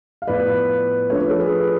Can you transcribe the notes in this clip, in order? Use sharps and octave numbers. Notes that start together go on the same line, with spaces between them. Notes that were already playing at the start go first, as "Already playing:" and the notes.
F5
A2 F3 B3 B4 D5
F3 A3 D4 C#5
B4
A4
G#4 B4